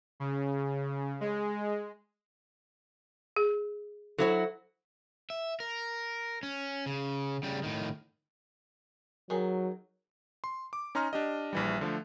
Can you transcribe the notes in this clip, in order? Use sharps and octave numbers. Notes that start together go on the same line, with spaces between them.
C#3
G#3
G#4
F#3 E4 F#4 A4 C5
E5
A#4
C#4
C#3
C#3 G3
A2 D#3
D#3 F#3 G#4
C6
D6
C#4 D#4 A#5 C6 F6
D4 G4 D#5
A#1 E3 G3
D3 F3 A3